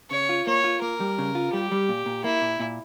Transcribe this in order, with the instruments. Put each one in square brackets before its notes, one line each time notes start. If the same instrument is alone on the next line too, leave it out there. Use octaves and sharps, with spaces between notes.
[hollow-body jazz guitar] C#3 [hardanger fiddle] C#5
[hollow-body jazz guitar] F4
[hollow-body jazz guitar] A#3 [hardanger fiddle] C#5
[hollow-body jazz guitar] F4
[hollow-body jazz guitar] A#3 [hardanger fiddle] A#4
[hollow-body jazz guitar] G3
C#3
F4
[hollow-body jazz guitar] G3 [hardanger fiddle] G4
[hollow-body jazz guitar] G3
A#2
A#2
[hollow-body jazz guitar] A#3 [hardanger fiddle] E4
[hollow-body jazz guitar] A#2
A#2